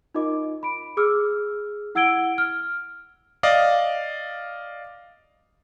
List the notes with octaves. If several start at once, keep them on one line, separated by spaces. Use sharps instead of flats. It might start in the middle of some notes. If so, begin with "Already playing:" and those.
D#4 F4 A#4 D#5 D6
B5 D7
G#4 D6 E6 F6
E4 F#5 E6 G#6 D7 G7
F6
D5 D#5 F5 D6